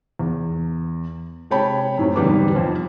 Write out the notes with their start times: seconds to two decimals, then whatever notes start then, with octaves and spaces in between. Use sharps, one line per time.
0.19 E2
1.51 C3 G#3 C#5 G5 A5 B5
1.98 F#2 A2 C3
2.16 E2 G#2 D3 G3 B4 D6
2.55 F2 C5